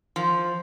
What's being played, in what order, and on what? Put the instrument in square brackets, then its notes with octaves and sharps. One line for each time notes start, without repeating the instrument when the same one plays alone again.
[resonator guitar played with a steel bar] F3